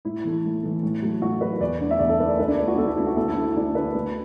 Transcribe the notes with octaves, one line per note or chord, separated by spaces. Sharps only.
A2 E4
E3 A3
A2
E3 A3
A2
F#3 A3
A2 F#4
F#3 A3 B4
E2 D5
D3 A3
E5
E2 D5
A4
D3 A3 B4
D5
D2 B4
D4
D3 A3 D5
F#4
D2 A4
E4
D3 A3 E4
F#4
D2 A4
E4
D3 A3
D2 D4
D3 A3 B4
D2